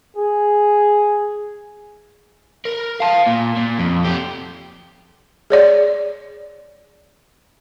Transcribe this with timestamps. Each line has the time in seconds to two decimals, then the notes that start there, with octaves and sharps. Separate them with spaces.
0.17 G#4
2.65 A#4
3.00 F5 A5
3.26 A#2
3.57 A#2
3.79 F2
4.05 F3 G4
5.50 G#4 C#5 D5